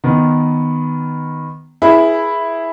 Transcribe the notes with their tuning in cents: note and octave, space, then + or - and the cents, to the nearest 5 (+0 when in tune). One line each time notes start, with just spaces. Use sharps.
D#3 +0 B3 +0
E4 +0 G#4 +0 B4 -35